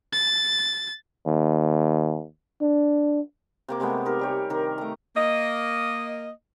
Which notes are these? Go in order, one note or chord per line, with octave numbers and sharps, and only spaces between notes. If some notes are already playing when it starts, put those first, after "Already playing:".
A6
D#2
D4
C3 A#3 D6
C3 G#3 A3 B3
D#4 G4 A#4
G3 G4 C#5
C3 D#3 A#4
A3 A#5
A#3 D#5